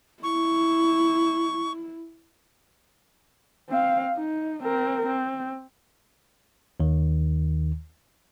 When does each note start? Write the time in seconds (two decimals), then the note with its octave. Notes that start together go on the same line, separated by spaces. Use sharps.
0.23 E4 C#6
3.70 C4 F5
4.17 D#4
4.63 C4 A#4
5.07 C4
6.80 D#2 D#3